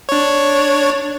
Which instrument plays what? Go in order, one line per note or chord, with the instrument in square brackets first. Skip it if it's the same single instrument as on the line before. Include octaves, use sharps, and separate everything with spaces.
[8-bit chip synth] D4 C#5